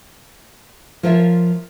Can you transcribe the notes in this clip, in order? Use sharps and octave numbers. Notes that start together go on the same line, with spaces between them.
F3 F4 A#4 C#5 D5 E5